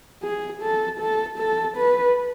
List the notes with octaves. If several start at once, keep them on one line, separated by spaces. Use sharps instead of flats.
G#4
A4
A4
A4
B4